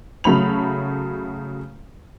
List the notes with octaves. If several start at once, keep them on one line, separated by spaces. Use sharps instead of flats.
C#3 F#3 A3 B5 F7